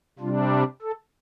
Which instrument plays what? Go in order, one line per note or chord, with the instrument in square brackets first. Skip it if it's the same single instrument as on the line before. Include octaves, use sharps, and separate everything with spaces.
[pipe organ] C3 G3 D4 F4
A4